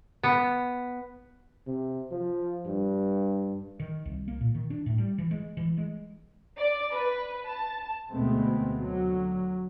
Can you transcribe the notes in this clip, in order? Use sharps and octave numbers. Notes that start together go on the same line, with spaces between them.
B3
C3
F3
G2
D#3
C2
A#3
A#2
D#3
D4
A2
G3
E3
G#3
E3
G#3
D5
B4
A5
D2 B2 G#3 A3 B3 C4
D3 F#3